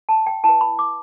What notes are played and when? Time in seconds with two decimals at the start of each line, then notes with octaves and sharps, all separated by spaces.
0.09 A5
0.26 G5
0.44 E4 B4 A5
0.61 B5
0.79 D6